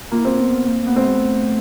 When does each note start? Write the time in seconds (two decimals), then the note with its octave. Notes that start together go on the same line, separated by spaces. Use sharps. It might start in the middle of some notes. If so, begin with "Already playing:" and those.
0.11 A#3 F4
0.19 E4
0.25 C4 F4
0.40 B3
0.68 A#3
0.82 A#3 B3
0.96 A3 C4
1.07 G#3
1.17 A3